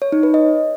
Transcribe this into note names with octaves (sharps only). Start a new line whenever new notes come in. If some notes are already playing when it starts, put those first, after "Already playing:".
C#5
D#4
B4
D#5